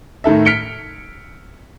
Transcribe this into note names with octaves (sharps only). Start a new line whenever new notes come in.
A2 D#3 A4 E5
F6 B6 C#7 D7 G7